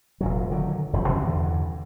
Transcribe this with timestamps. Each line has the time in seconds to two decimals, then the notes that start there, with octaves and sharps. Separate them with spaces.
0.21 F1 A#2 F#3
0.51 D3 D#3 F#3
0.93 E1 F#2 F3
1.08 B2 E3 F#3 C#4
1.23 E2 G2 D3